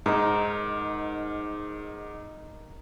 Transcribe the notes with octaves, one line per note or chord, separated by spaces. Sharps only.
G#2 D#4 A#4